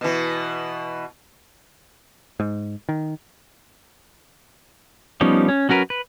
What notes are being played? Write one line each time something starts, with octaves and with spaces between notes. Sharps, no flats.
B2 E3
G#2
D#3
F3 G3 B3 C#4 D#4
C#4
F#3 C#4 F#4 A#4 B4
B4